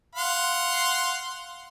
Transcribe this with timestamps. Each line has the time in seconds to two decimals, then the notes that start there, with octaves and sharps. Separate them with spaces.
0.15 F5 F#5 C6